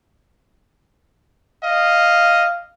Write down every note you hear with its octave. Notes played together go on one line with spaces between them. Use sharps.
D#5 F5